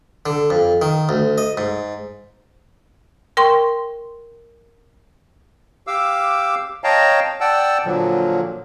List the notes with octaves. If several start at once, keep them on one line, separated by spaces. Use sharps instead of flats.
D3
F2
D#3
D2
D#5
G#2
A#4 G5 C6 C#6
G4 F5 D6 E6
C#5 D#5 F5 G5 A5 A#5
D5 F#5 G5 A5 E6
A#2 D3 F3 F#3